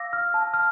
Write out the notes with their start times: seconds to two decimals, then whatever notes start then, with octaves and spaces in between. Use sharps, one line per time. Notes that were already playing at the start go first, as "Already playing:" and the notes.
Already playing: F5 D6 E6 A#6
0.13 F6
0.34 A5
0.54 F6